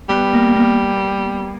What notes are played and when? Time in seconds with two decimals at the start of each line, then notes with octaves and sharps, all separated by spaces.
0.09 G3 B3
0.34 A#3
0.56 A#3